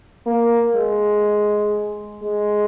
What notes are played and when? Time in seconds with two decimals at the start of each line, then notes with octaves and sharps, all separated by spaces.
0.26 A#3
0.76 G#3
2.23 G#3